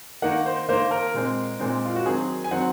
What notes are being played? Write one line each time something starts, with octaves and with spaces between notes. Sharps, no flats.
D#3 A#3 F#5
C5
D#3 A#3 C5
A#4
A#2 G#3 C4
A#2 G#3 C4
F4
F#4
D#3 F#3 C4 G#4
G#5
D#3 F#3 C4 F#5